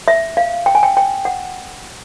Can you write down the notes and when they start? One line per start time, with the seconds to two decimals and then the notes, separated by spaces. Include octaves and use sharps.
0.08 E5
0.37 F5
0.66 G5
0.75 G#5
0.83 G5
0.97 G5
1.25 F#5